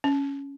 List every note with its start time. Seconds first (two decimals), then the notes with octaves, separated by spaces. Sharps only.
0.04 C#4